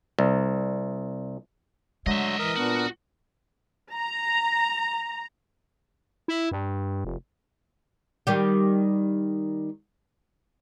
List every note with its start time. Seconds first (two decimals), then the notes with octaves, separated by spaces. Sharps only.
0.19 C2
2.06 D3 F#3 G#3 A3 D#5 E5
2.39 E3 A#4 D#6
2.56 A#2 B3 D4 F#4
3.93 A#5
6.28 E4
6.51 G2
7.05 F1
8.27 D#3 G3 G4